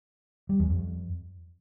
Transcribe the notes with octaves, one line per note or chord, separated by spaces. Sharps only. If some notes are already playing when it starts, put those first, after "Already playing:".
G3
E2
F2